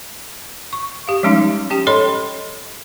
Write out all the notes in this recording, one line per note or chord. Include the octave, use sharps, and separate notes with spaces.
C#6
G4 F5
F3 G3 G#3 C#4 D#4
C#4 G4 G5
A4 C#5 D#5 B5 C6